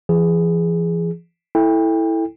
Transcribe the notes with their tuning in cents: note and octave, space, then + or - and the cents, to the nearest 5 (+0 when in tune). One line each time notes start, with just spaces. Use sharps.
E3 +45 G#4 +0
E4 -10 A4 +0 G5 +35